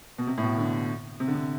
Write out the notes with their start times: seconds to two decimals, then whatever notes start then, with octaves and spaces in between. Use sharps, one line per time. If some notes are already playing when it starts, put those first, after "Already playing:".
0.18 B2
0.27 C3
0.38 A2
0.42 B2
0.58 D3
1.20 C3
1.28 D3
1.35 C3